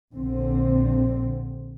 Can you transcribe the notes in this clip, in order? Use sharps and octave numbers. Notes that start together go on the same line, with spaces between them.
A#1 D3 C4